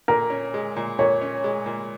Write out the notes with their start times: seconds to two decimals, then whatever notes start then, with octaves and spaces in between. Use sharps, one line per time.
0.08 A#2 A#4
0.30 C#4
0.54 G#3
0.76 A#2
0.99 A#2 C#5
1.22 C#4
1.44 G#3
1.66 A#2